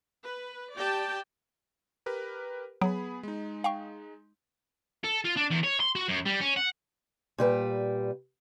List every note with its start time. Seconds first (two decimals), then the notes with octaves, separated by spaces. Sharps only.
0.25 B4
0.74 G4 D5 G5 A5
2.06 G4 A#4 B4
2.81 F#3 B3 G#4 B5
3.23 G#3 D#4
3.64 F5 G5 C#6
5.04 A4
5.25 F4
5.37 D4
5.51 E2
5.64 C#5
5.80 C6
5.95 F#4
6.08 F#2
6.26 G3
6.41 C#4
6.56 F#5
7.38 A#2 G3 B4